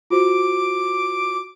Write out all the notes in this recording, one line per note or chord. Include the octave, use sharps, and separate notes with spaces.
F4 F#4 C5 D6